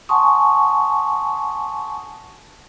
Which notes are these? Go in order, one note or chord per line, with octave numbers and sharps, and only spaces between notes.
F#5 G#5 A5 C6 C#6 D#6